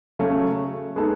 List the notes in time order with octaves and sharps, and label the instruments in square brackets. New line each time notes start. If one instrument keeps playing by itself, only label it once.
[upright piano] C#3 F#3 A3 C#4
G#3 B3 D#4 A4